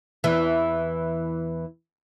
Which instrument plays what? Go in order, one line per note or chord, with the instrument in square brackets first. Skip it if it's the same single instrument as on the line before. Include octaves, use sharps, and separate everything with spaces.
[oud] E2 E3